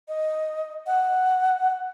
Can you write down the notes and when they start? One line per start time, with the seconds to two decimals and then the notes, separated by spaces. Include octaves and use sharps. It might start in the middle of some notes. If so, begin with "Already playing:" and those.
0.08 D#5
0.87 F#5